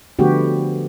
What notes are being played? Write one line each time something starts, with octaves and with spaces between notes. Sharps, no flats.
D3 F3 A3 B3 F#4 G4